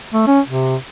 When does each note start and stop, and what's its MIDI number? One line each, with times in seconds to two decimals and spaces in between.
0.14 0.23 57
0.27 0.40 61
0.47 0.76 48